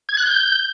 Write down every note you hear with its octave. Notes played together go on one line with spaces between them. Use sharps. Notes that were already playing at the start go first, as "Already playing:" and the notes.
G#6
F#6
G6